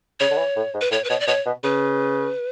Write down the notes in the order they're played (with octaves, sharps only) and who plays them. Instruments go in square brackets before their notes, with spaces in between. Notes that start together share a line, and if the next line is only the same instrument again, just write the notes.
[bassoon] C#3 [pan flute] C#5
[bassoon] D3
E3
A2
G#2
[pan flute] B4
[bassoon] A2 [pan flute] C#5
[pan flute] B4
[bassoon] B2 [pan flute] C#5
[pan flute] D5
[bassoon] B2 [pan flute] C#5
[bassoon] B2
[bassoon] C#3 [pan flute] B4